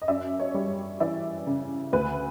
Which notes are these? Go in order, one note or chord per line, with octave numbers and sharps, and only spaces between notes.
D#5
F#2 D5 E5
C#5 D#5
G3
E3 D5 E5
C#3
D2 B4